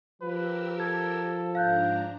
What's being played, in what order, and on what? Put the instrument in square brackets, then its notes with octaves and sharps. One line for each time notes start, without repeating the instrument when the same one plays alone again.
[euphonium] F3 [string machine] G4 A#4 E6 [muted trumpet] B4
[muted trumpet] A4 [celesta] G#6
[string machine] G#2 D4 A#5 [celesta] F5 F#6 G6